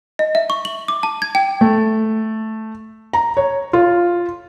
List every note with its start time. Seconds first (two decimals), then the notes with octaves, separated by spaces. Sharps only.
0.19 D#5
0.35 E5
0.50 C#6
0.65 F#7
0.88 D6
1.03 A5
1.22 G#6
1.35 G5
1.61 A3
3.13 A#5
3.37 C#5
3.73 F4